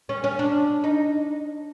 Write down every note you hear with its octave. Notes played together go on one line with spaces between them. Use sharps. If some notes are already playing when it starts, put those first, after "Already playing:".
C#4
C#4
D4
D#4